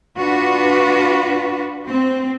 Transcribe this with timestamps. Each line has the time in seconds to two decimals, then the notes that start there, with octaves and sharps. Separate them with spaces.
0.17 D4 F4 F#4 B4
1.87 C4